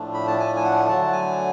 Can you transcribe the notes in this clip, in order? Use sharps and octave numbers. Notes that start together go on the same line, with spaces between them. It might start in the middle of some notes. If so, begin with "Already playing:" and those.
Already playing: A2 F3 A3 D4
B5
A5
G#5
G#5
F#5
D3 F#3 A3 A5
G#5